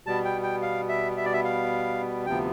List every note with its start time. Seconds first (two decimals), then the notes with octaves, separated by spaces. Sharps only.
0.06 B2 G3 B3 A5
0.25 G5
0.43 G5
0.62 F5
0.89 E5
1.17 E5
1.25 D5
1.33 E5
1.44 F5
2.26 D2 C3 F3 B3 G5